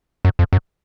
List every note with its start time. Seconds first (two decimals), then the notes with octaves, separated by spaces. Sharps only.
0.25 F#2
0.39 F2
0.53 F#2